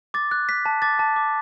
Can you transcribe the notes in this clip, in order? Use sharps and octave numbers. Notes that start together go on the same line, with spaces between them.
D6 A6
F#6
F#6 B6
A5
D6 A6
A5
D6